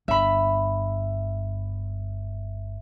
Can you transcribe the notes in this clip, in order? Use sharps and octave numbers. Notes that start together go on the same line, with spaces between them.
G1 E5 B5